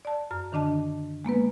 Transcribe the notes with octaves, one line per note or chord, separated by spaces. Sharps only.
D5 A5
F#2 F6
D3 D#3 D4 D#5 A5
G#3 A#3 B3 B4